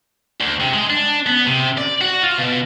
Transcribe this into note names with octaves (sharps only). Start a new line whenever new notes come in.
D2
C3
G#3
D4
B3
C3
D5
F#4
F4
B2